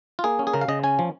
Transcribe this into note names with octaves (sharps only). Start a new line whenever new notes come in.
F4
A#3 G#4
C#4
G#4
C#3 A#4
F5
C#3 D#5
C#4 G#5
F3